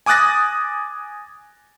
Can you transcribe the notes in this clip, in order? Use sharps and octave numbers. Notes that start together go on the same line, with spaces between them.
G#5 D6 D#6 F#6 A6 A#6